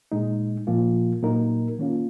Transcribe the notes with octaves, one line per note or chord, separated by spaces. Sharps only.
A#2 G#3 D#4
A#2 F3 A#3 F4
A#2 F#3 A#3 D#4 A#4
D#3 A#3 C#4 F4